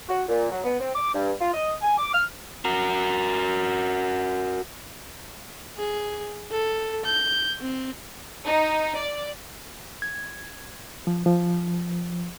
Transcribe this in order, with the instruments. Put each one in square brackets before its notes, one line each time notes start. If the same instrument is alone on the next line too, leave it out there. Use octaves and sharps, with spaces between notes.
[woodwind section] F#4
A#2
F#3
B3
C4
D6
G2
F4
D#5
G#5
D6
F6
[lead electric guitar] F#4 A#4
[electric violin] G#4
A4
G6
C4
[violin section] D#4
D5
[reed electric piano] G#6
F3
F3